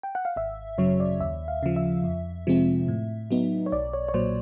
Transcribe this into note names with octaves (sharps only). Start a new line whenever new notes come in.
G5
F#5
F5
G#1 E5
F#2 C#3 F#3 C#5
D5
D#2 E5
F5
C#3 F3
E5
F2
C3 F3 G#3 C4
A2
F#3 B3 D#4
C#5
B1 D5
C#5
C#5
A#2 F#3 C5